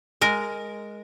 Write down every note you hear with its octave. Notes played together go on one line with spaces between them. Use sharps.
G#3 A#4